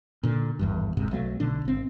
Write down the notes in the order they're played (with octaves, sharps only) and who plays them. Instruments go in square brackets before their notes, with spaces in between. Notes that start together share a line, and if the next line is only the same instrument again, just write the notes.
[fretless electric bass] A#2 D3
G#1 E2 G2
D1 G1 G#2 C3
B1 F#3 A3
B1 B2 D3 D4
G#1 C4